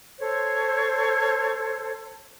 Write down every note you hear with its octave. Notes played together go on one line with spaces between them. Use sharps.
A4 C5 C#5